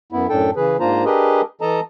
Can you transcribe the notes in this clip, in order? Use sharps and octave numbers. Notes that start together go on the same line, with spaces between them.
F#2 B3 E4
F#2 A2 D4 A4 G5
C#3 E3 G#4 B4
G#2 A#3 D4 F4 C5 A#5
D4 G4 G#4 A#4 B4 D#5
E3 A4 D#5 A5 A#5